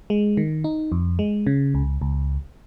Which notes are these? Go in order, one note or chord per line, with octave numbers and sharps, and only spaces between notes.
G#3
D#3
D#4
F2
G#3
C#3
C#2
C#2